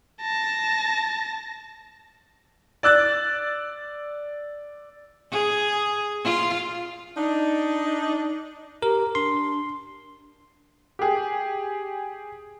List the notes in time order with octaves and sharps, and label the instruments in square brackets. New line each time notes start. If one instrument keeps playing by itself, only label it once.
[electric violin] A5 A#6
[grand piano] D5 E6 F#6 A6
[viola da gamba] G#4
F4
[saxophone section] D4 D#4
[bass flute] G4 [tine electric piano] A#4
[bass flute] D4 [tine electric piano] C6
[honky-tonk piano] G4 G#4